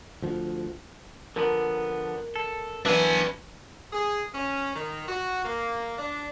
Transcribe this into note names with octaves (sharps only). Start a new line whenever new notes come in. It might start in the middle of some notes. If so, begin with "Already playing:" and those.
D2 F3
D3 F3 B3 A#4
A4
E3 F#3 D4 B4 D5 E5 G#5
G#4
C#4
D#3
F#4
A#3
D4